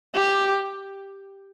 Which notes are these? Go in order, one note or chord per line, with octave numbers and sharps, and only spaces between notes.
G4